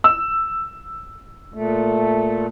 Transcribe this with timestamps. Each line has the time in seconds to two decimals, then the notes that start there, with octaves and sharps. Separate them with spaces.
0.04 E6
1.54 A#2 A3